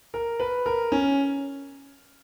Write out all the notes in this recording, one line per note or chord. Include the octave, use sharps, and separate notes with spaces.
A#4
B4
A#4
C#4